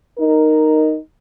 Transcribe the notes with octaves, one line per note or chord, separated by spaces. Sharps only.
D#4 A#4